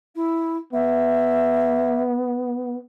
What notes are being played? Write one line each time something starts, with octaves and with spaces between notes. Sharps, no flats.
E4
B3 E5